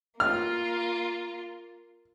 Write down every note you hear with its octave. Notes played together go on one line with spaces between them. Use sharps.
A#3 F4 F6